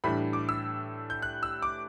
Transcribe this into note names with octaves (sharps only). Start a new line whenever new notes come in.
A2 E3 G3 D4 B5
D6
E6
G6
F#6
E6
D6